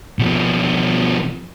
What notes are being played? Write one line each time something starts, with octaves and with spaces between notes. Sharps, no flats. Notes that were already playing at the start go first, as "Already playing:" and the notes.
B2 F3